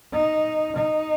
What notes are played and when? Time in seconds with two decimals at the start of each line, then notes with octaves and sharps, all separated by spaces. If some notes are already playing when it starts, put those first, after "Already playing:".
0.13 D#4
0.76 D#4